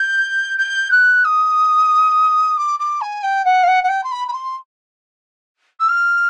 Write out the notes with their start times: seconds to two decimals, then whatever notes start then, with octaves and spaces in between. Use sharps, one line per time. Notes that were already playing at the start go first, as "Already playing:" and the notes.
Already playing: G6
0.58 G6
0.91 F#6
1.24 D#6
2.57 D6
2.79 D6
3.01 G#5
3.22 G5
3.44 F#5
3.63 F5
3.67 F#5
3.83 F#5
3.88 G5
4.03 C6
4.11 B5
4.28 B5
4.32 C6
5.80 E6
5.88 F6